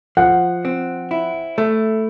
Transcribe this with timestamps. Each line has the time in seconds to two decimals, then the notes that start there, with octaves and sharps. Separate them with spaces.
0.17 F3 F#5
0.65 C4
1.11 E4
1.58 A3